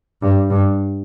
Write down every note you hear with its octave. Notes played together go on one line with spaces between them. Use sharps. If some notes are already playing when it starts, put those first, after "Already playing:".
G2
G2